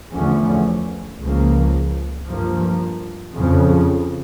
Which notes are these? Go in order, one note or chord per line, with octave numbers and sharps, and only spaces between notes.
E2 D3 F3 A3 C#4
C#2 C#3 F3 A#3
G2 F3 A#3
F2 C#3 F3